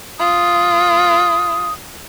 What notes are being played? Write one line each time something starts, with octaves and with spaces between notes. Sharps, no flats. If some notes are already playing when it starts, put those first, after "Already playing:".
F4 D#6